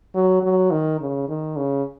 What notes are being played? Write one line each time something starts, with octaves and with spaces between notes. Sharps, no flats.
F#3
F#3
D#3
C#3
D#3
C#3